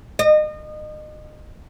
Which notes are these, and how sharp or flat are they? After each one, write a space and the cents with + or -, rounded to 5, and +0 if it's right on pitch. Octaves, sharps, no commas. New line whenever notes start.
D#5 -30